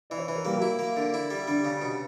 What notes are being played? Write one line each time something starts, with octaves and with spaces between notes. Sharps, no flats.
E3 D5
C#5
E3 B4
A#4
G3 A#3 G4
F#3 F#4
E4
A#3
D3
E4
G3
D3 G3 D4
C#3
B2